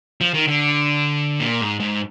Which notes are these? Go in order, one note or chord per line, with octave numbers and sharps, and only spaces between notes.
F3
D#3
D3
A#2
G#2
G#2